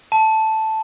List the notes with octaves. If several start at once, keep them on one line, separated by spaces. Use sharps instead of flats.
A5